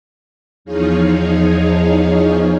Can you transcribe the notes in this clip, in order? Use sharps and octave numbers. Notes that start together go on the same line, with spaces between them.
E2 F3 D#4 G#4 C#5 F5